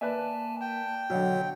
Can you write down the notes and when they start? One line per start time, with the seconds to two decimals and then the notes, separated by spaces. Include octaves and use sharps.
0.01 A#3 B4 D5 E5 G#5 A5
0.61 G5 A5
1.10 B1 D3 F#3 F#4 C#5 F#5